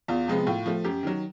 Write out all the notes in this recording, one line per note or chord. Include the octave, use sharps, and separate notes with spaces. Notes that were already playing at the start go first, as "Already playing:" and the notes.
E2 F4
C3 F3 G#3 B3
A2 F4
F3 A3
F#2 G4
D#3 F#3